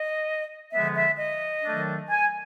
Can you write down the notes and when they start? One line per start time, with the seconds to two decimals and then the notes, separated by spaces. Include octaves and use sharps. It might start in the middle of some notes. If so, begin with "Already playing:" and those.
Already playing: D#5
0.73 D3 F3 G#3 B3 E5
0.96 E5
1.19 D#5
1.64 D#3 F#3 A3 D4
2.10 G#5